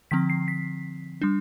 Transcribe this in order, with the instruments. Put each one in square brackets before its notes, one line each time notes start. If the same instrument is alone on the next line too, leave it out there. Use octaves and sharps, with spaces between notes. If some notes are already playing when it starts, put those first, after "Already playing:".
[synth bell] D3 F3 C4 B6
C7
B6
G3 D4